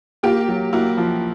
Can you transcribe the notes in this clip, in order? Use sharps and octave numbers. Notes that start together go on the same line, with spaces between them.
A#3 F4 G4
F#3
A#3 E4 F#4
F3